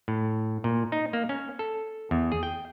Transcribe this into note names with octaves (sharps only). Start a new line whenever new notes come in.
A2
A#2
D#4
A#3
C#4
A4
E2
G#4
G5